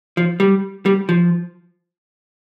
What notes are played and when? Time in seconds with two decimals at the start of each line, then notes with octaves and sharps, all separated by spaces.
0.17 F3
0.40 G3
0.86 G3
1.09 F3